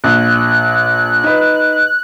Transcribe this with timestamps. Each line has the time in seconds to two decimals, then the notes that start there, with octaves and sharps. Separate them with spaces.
0.04 A#1 F#6
1.24 D#4 B4